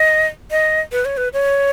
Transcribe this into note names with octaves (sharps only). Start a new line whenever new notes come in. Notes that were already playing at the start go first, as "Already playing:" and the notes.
Already playing: D#5
D#5
B4
C#5
B4
C#5